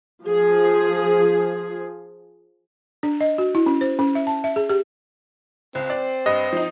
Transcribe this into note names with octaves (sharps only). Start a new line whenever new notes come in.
F3 G#4
D4
D#5
F#4
E4
C#4
C5
C#4
E5
A5
E5
G#4
G4
C#2 C4
D5
G2 D#5
F3 D#4